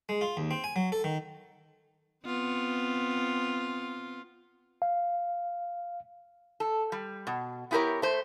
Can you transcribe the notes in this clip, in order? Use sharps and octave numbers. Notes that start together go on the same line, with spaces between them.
G#3
F4
D#2
C4
G#5
F#3
A4
D#3
B3 C4 F4
F5
A4
G3
B2
B3 E4 G4 A4 A#4 C#5
A3 C5